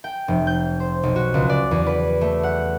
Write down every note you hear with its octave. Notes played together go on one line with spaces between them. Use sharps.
G5
F1
G6
C5
B1
F#4
C#2
D5
E2
B4
A3
F#5